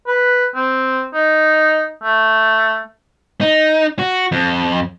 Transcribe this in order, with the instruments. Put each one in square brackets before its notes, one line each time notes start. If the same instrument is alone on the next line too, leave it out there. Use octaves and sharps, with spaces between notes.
[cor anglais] B4
C4
D#4
A3
[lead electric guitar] D#4
F#4
F2